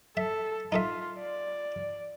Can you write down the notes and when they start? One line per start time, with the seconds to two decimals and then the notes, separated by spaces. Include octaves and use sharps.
0.17 A4 E5
0.72 D#4 F4 A4 E5
1.19 D5